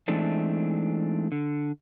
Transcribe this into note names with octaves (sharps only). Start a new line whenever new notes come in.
E3 G#3 A3 C4 D4 D#4
D3